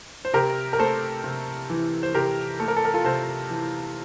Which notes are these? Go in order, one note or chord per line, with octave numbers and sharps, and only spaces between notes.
C5
C3 G4 A#4
A#4
A3 A4 C5
C3
E3
C5
C3 G4 A#4
A3 A4
A#4
A4
A#4
F4 A4
C3 A4 C5
E3